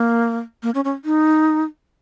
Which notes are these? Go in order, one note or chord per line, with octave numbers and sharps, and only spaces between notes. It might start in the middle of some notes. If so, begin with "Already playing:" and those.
Already playing: A#3
A#3
C#4
C#4
D#4